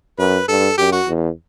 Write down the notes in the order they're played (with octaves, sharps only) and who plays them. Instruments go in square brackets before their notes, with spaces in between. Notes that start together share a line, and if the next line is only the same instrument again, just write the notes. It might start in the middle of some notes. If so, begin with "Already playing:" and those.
[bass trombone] F#2 [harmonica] B4
[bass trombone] G2 [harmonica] A4
[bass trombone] F#2 [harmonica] G4
[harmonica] F#4
[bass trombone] E2